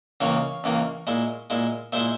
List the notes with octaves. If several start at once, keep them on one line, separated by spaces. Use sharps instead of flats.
C#2 C#3 E3 A#3 C#5 F5
C#2 C#3 E3 A#3
A#2 G#3 E4
A#2 G#3 E4
A#2 G#3 E4 C5 E5